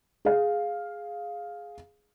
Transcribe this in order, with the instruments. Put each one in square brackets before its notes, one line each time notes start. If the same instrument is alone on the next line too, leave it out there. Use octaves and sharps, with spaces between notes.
[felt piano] G#4 F5